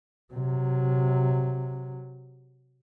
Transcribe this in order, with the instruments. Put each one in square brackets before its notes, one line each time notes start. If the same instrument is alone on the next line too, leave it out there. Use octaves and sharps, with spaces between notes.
[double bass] C3 F#3